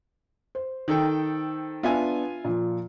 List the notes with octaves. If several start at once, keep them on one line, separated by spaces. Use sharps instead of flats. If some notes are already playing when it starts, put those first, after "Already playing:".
C5
D#3 A4 G5
B3 D4 F4 E5 G#5
A#2 F3